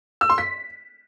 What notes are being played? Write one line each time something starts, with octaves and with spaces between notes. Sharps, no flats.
E6
C6
B6